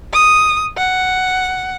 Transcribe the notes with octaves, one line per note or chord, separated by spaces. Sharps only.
D#6
F#5